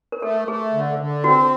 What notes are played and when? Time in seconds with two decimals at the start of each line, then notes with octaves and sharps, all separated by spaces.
0.12 A#4
0.22 A3 A4
0.48 A3 G#4
0.74 D3
0.99 D3
1.24 C4 F#4